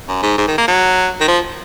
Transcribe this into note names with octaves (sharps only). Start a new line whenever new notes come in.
F#2
G#2
G#2
D#3
A#3
F#3
D#3
F3